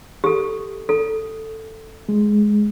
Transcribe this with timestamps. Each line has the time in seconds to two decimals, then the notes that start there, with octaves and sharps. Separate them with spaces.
0.24 G4 A4
0.89 A4
2.09 G#3